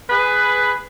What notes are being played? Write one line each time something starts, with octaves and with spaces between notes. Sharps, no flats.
G#4 B4